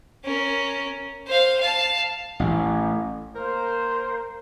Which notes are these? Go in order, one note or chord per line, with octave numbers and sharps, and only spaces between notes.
C#4 A#4
C5 F5
F5 A5
A1
A#3 A#4 C5